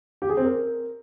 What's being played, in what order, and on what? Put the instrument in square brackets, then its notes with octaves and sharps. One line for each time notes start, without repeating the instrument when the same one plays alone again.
[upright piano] G4
G#4
C4
A#4